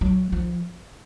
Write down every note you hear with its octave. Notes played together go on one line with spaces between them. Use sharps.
F#3
F3